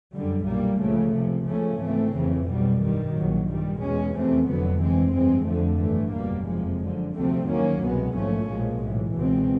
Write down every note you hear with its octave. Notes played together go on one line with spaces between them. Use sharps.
F#2 D3 G3
B1 A#2 G3 A#3
C#2 C#3 F3 A3
C#2 C3 F3
C#2 C#3 F3 A3 C#4
G#2 E3 A3 C4
F#1 F2 C#3 E3
B1 B2 G3
G2 D#3 G3
A#1 A#2 F#3
G2 D#3 G3
E2 B2 G#3 C#4
F2 C3 E3 A3 C4
F1 F2 D3 F#3 B3
G2 E3 G#3 C4
G2 E3 G#3 C4
F2 D3 F3 A3
A1 G2 E3 A3
F#1 E2 B2 G3 A#3
F2 C3 F3 G#3
F#2 D3 F3
D2 C3 F3 A3 C4
D#2 D#3 F#3 A#3 C#4
C2 B2 G#3 B3
A#1 G#2 F3 A3 C#4
B1 A#2 F3 G#3
B1 A2 E3
C#2 B2 G#3 C4